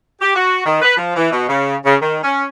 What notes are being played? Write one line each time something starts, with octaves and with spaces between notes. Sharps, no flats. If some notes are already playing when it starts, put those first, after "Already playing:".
G4
F#4
D#3
B4
F3
E3
B2
C#3
C#3
D#3
C#4